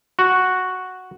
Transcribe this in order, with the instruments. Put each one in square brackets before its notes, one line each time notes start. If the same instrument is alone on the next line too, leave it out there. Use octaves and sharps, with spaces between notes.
[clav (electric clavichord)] F#4